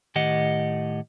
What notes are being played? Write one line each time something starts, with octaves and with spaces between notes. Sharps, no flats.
A2 D#3 G4 D#5 F#5